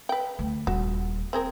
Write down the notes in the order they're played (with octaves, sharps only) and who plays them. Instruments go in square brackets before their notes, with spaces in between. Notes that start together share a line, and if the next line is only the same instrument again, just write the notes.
[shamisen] B4 G5
[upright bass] D2
[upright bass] D#1 [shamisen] F#4
[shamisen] C4 G#4 A#4